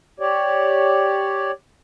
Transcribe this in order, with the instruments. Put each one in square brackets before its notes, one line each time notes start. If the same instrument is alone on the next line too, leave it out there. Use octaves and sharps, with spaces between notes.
[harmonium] G4 C#5 D5